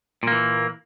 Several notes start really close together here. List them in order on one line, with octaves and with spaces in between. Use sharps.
A#2 A#3 E3